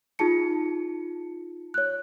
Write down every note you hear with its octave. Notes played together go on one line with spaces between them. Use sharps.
D#4 F4 G#4 A5 C#7
C#5 F#6